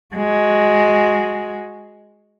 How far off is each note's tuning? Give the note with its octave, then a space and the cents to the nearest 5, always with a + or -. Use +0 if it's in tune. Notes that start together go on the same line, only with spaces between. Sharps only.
G#3 +5 F#4 -10